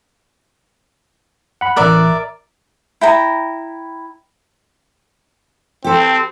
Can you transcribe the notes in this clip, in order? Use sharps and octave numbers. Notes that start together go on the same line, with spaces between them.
F#5 B5
A1 A#4 D5 E5 F#6
E4 G5 A#5
C4 G4 A4